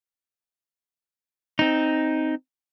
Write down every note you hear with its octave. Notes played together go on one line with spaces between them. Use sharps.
C4 D#4